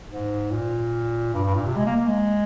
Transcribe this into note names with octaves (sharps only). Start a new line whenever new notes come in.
G#2
A#2
G2
G2
A#2
C3
G#3
A#3
A#3
G#3